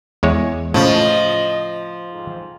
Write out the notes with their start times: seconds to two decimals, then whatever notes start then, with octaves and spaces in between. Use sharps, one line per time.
0.23 E2 G#3 C#5
0.74 A2 C#3 F3 D#5
2.10 F2 G#2